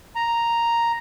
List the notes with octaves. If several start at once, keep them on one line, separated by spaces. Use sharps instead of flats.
A#5